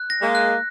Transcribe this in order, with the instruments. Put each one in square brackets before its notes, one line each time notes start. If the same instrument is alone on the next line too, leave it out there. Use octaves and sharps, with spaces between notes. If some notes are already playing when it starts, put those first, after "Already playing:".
Already playing: [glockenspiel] F#6
A#6
[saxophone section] G#3 A#3
[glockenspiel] F#6